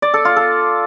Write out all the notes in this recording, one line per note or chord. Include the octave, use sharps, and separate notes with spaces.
D5
A4
F4
A4